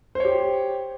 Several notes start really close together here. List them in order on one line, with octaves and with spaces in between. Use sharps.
C5 C#5 G4